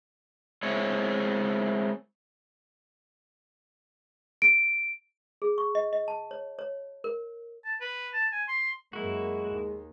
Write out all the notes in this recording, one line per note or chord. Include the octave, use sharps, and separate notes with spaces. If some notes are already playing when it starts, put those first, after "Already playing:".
G#3 C4 E4 C#5
D7
G#4
C#6
D#5
D#5
A5
C#5
C#5
A#4
A5
B4
A5
G#5
C6
F#2 G#3 A#3 E4 F#4
D#2